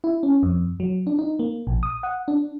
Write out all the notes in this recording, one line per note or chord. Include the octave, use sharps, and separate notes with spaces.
E4
C#4
F2
F#3
D4
D#4
A#3
A#1
D#6
F#5
D4